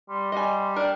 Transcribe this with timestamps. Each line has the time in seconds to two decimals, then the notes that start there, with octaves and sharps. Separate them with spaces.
0.09 G3 C6
0.32 G3 D#5 G#5
0.76 D4 A#4 G5